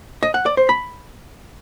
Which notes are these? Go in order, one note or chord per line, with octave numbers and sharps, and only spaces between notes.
D#5
F#5
D5
C5
B5